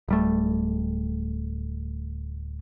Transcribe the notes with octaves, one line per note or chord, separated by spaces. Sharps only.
D1 G3 A3